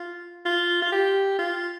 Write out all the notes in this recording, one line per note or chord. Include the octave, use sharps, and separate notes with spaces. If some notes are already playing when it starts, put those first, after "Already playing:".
Already playing: F4
F4
F4
G4
F4